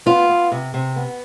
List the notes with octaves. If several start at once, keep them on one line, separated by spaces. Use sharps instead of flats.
B3 F4
B3
C3
C3
B3